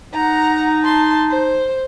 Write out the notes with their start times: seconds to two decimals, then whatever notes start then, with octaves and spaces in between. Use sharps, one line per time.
0.14 D#4 F#5 A#5
0.81 A5 C6
1.30 C5